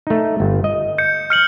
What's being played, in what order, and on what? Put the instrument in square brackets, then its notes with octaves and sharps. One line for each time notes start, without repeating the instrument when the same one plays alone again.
[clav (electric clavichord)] A3 D#4
G1
D#5
[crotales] G6 C#7
F6 C#7 F#7